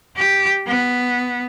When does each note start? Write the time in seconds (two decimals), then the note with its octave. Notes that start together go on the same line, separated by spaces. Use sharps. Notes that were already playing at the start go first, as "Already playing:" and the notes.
0.17 G4
0.67 B3